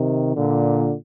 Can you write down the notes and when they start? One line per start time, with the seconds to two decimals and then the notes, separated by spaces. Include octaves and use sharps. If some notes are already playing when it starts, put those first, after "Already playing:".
Already playing: C3 D#3
0.36 A#2 D3